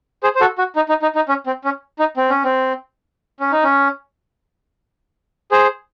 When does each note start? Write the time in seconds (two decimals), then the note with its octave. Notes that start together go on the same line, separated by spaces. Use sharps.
0.23 G#4 C5
0.35 C5
0.41 F#4 A4
0.58 F#4
0.76 D#4
0.89 D#4
1.02 D#4
1.15 D#4
1.28 C#4
1.46 C4
1.64 C#4
1.99 D#4
2.17 C4
2.30 C#4
2.44 C4
3.40 C#4
3.52 D#4
3.64 C#4
5.52 G#4 C5